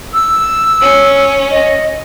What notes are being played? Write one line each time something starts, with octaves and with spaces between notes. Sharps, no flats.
E6
C#4
D#5